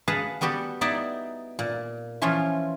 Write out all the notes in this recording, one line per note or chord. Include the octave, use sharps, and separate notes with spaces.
G#4 B4 F5 F#5 A5
G3 B3 F#4 G4 A4
B3 D#4 E4 D5
A#2
E3 F3 C#4 E4 F4